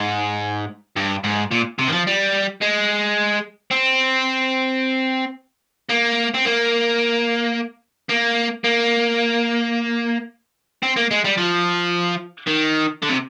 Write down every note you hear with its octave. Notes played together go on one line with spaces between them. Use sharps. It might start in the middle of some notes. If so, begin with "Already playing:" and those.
Already playing: G#2
G2
G#2
A#2
C3
D#3
F3
G3
G#3
C4
A#3
C4
A#3
A#3
A#3
C4
A#3
G#3
G3
F3
D#3
D3
C3